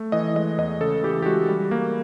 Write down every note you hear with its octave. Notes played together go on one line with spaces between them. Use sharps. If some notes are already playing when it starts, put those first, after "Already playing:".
Already playing: A3
E3 D#5
G#3 D#5
E2 D#5
C#3 A4
E3 G4
G4
G#3 F#4
G3
A#3